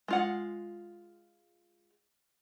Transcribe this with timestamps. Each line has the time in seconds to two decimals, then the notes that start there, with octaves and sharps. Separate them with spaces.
0.08 G#3 F4 F#5